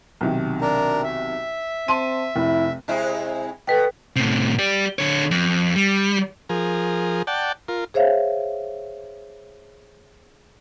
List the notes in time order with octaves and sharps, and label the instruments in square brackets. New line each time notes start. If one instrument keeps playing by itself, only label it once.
[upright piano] B1 C3 D#3
[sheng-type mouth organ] D4 A#4
E5
[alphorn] C4 [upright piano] A5 C6 D#7
[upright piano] F1 [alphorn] E4
[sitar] C3 G#3 E4
[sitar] B2 [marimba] A4 B4 G5
[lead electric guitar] A2 C3
G4 D5
D3 C#5
F2
G3
[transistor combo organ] F3 G#4 A#4
D5 F#5 G5 A5
F4 A#4
[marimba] G#4 C5 C#5 E5 F5